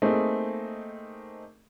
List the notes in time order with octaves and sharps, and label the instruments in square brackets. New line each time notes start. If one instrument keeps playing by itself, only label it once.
[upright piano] A3 A#3 C4 D#4 G#4